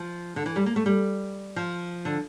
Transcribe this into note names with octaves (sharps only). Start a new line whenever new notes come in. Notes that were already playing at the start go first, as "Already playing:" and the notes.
Already playing: F3
D3
E3
G3
A#3
A3
G3
F3
D3